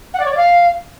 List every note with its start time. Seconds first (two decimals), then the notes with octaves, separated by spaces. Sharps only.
0.13 F#5
0.19 D5
0.25 C#5
0.31 D5
0.37 F5